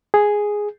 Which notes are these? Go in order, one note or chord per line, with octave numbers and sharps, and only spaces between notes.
G#4